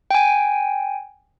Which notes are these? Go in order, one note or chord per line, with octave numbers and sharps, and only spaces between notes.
G5 G#5